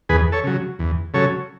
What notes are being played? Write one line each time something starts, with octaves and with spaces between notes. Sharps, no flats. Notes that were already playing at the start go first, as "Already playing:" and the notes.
E2 G#4 B4
A4 C#5
C#3 F#3
E2
C#3 F#3 A4 C#5